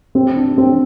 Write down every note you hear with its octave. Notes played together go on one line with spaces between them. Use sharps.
C4
D4
C4